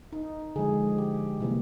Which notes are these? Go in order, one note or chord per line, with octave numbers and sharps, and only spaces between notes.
D#4
D3 F3 G#3 G#4
G4
C3 E3 G3 A#3